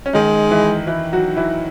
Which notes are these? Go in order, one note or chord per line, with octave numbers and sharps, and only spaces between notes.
C#4
D#3 G#3 D#4
E3 E4
E3 E4
F#3 F#4
E3 E4